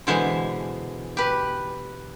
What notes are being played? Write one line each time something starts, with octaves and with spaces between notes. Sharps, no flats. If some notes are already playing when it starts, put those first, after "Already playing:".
B2 D3 E3 G#3 C5 G#5
G4 B4